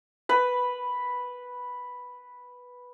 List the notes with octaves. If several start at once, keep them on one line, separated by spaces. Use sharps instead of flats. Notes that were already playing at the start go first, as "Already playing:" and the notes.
B4 B5